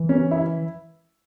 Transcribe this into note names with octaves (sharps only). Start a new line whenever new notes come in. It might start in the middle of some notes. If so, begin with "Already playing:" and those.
Already playing: E3
C#4
E4